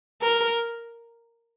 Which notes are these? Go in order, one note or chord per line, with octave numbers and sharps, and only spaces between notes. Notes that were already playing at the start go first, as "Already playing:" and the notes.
A#4